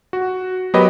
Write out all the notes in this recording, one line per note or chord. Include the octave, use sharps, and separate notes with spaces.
F#4
F#3 B3 G4 A#4 B4 D#5